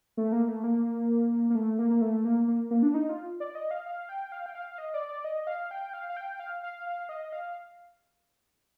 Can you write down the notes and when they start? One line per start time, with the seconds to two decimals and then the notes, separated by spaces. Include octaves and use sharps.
0.17 A3
0.32 A#3
0.48 A3
0.64 A#3
1.50 A#3
1.55 A3
1.79 A#3
1.90 A#3
2.01 A3
2.25 A#3
2.48 A#3
2.71 A#3
2.82 D4
2.94 D#4
3.09 F4
3.40 D5
3.55 D#5
3.71 F5
3.86 F5
4.09 G5
4.32 F5
4.46 G5
4.55 F5
4.71 F5
4.78 D#5
4.94 D5
5.09 D5
5.24 D#5
5.47 F5
5.71 G5
5.93 F5
6.09 F5
6.17 G5
6.40 F5
6.63 F5
6.86 F5
7.09 D#5
7.32 F5